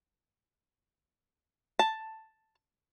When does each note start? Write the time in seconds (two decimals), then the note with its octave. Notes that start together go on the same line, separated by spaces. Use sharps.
1.79 A5